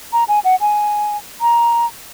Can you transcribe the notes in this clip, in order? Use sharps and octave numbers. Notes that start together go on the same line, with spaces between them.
A#5
G#5
F#5
G#5
A#5